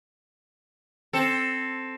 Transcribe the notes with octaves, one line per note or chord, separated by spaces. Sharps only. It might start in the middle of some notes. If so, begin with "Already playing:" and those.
C4 A4